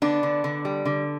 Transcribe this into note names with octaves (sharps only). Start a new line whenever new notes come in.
D3 B3 D4
D3
D3
G3
D3